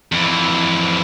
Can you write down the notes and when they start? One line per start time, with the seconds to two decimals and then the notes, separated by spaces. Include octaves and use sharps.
0.12 F2 E3